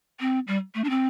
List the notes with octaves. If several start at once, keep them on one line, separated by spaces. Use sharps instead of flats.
C4
G3
A3
D4
C4